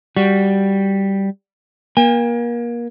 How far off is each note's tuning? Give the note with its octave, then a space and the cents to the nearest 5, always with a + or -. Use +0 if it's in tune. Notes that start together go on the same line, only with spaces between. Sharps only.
G3 +0 F#4 +10
A#3 +30 G#5 -45